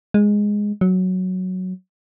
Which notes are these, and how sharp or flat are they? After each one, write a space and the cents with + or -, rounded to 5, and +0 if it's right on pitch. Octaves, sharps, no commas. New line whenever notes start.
G#3 -5
F#3 +0